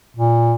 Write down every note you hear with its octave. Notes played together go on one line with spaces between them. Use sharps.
A#2